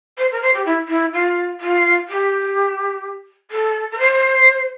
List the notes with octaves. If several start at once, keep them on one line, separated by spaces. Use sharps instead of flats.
C5
A#4
C5
G4
E4
E4
F4
F4
G4
A4
A#4
C5